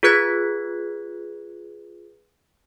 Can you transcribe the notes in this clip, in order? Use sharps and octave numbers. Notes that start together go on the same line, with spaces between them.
F4 G#4 B4 F#6 G#6 B6